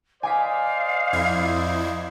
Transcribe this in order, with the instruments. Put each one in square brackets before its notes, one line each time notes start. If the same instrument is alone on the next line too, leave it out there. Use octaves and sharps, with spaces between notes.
[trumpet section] C5 D5 D#5 [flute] F5 [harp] G#5 D6 B6
[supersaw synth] F2 E4 G#6